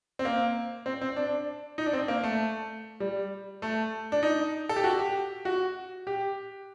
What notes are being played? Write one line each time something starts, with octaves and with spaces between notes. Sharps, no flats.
C4
A#3
C4
C4
D4
D#4
D4
C4
A#3
A3
G3
A3
D4
D#4
A4
G4
F#4
G4
F#4
G4